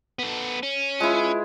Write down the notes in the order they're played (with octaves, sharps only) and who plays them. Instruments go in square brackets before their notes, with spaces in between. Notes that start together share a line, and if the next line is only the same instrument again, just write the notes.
[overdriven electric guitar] B3 A4
C#4
[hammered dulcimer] G#3 E4 [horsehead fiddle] F4 B4